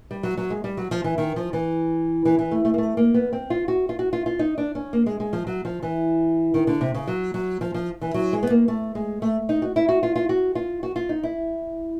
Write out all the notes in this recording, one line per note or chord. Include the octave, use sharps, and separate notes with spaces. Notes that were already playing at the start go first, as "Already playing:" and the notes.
G3
F#3
F#3
G#3
G3
F#3
F3
E3
D#3
F3
E3
E3
E3
A3
A3
A#3
A3
A#3
B3
C4
F4
F#4
F4
F#4
F4
F4
D#4
D4
C#4
A#3
G#3
G#3
F3
F#3
F3
E3
D#3
D3
C3
C#3
F#3
F#3
F3
F3
E3
F#3
G#3
B3
A#3
A3
G#3
A3
D#4
F#4
E4
F#4
F4
F4
F#4
F4
F#4
F4
D#4
E4